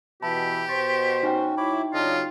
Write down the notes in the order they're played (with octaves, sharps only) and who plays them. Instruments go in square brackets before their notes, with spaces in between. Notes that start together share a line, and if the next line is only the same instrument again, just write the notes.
[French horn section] B2 E3 [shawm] G4 [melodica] E5 B5 [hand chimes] A5
[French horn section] B2 C5 [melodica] C6 C#6 [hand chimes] A6
[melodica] C#4 F#4 [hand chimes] D#4 G5
[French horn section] F#3 E4 [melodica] C#5 B5 D6
[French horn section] C#3 F#3 [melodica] D4 D#5 [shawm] F4